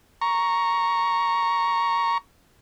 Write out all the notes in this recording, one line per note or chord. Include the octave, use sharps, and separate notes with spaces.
A#5 C#6